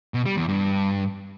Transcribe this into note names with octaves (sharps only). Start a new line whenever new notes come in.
B2
G3
E2
G2